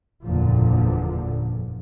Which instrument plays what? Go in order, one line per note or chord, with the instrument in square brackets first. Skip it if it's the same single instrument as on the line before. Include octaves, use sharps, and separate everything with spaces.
[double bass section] F#1 E2 A#2 D3 F3